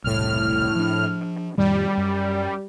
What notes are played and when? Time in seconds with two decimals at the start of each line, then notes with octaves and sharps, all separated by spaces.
0.04 E1 C2 A2 F6
0.75 F3 D4
1.58 F2 A2 D#3 G3
1.97 F#2